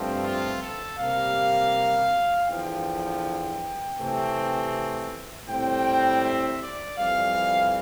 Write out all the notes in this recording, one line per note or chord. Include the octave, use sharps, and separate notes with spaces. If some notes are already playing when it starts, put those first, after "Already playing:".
Already playing: G2 F3 A3 C4
F4
A4
C3 G3 A#3 F5
E2 D3 F3 G5
C3 E3 A3 C4
A2 G3 C4 G5
E5
D5
F2 E3 G3 F5